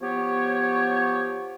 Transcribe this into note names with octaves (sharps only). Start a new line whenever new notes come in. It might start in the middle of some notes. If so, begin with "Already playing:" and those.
F3 B3 G4 C#5